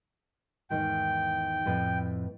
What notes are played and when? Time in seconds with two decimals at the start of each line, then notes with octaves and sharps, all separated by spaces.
0.70 E2 G#2 D#3 G5
1.66 F2 A2 B4